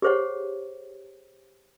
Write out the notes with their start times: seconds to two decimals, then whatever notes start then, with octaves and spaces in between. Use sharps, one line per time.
0.02 G4 G#4 C5 C#5 F#5